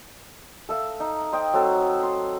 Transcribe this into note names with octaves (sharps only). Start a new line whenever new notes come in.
A4 E5 F5
D#4
C5 D#5 G5
F#3 C4 F#4 A4
C6